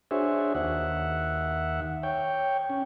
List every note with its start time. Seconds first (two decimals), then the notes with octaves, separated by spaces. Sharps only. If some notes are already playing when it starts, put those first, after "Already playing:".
0.11 D4 F#4 G#4 C5 C#5 E5
0.55 D#2 E5 F#5
2.03 C#5 G5
2.70 C#4